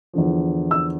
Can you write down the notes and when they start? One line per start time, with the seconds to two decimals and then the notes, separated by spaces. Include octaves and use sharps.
0.14 E2 D3 F3
0.71 E6